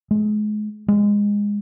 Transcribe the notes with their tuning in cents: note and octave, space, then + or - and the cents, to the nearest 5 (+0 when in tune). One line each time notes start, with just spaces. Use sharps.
G#3 +35
G#3 -15